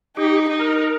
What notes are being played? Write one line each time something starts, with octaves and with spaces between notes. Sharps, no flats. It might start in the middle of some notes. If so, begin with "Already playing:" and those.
D#4 G4
D#4
A#4